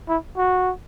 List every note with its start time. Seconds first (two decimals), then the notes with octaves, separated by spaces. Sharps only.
0.08 E4
0.37 F#4